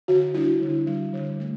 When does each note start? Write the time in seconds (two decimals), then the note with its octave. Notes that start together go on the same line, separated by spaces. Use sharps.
0.08 D3 F#4
0.34 G3 D4 E4
0.62 D3
0.87 G3 D4
1.13 D3
1.40 A3